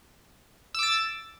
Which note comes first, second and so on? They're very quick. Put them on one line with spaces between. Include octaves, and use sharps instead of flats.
E6 D6 A6